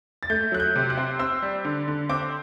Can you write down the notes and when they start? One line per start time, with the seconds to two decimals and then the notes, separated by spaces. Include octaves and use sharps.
0.23 A6
0.30 A3 G6
0.52 F#3 F#6
0.60 G6
0.76 C3
0.90 F#6
0.97 C4
1.19 C4 E6
1.42 G3
1.65 D3
1.88 D3
2.09 C4 D6